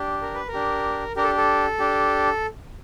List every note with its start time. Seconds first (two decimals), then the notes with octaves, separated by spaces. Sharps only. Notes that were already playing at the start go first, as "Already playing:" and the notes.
Already playing: D4 G4
0.22 A#4
0.34 B4
0.48 A#4
0.53 D4 G4
1.16 D4 G4 A#4
1.23 A4
1.38 A4
1.80 D4 G4